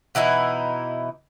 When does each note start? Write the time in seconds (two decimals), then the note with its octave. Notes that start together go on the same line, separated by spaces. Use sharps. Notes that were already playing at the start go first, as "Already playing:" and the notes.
0.15 B2 E3 D#4 E4